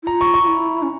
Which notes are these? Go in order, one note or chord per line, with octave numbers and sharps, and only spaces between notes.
E4
F4 A#5
C#6
C#6
F4
E4
C#4